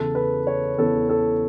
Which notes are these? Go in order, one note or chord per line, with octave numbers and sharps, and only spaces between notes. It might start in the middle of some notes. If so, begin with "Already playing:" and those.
Already playing: E2 C#3 E3 A4
B4
C#5
E2 C#3 E3 A4
A4